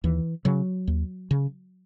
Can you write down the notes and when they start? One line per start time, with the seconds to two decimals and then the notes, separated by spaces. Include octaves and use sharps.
0.04 D#2 E3
0.45 C#3 F#3
0.87 D#2
1.31 C#3